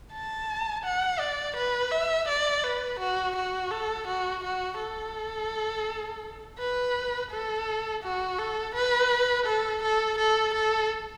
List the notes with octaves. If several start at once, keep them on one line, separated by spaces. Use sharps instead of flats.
A5
F#5
D5
B4
E5
D5
B4
F#4
F#4
A4
F#4
F#4
A4
B4
A4
F#4
A4
B4
A4
A4
A4
A4